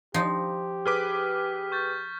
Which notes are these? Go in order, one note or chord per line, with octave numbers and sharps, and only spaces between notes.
F3 D#4 G4
G#4 B4 D6 F6 B6
C#6 G6 A6